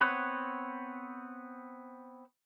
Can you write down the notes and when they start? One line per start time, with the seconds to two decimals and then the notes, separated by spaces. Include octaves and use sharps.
0.01 B3 C4 B4 C#5 F#5